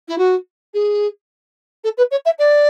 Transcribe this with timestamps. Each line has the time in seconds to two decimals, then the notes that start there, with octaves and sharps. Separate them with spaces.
0.08 E4
0.18 F#4
0.74 G#4
1.84 A4
1.97 B4
2.11 C#5
2.25 E5
2.38 D5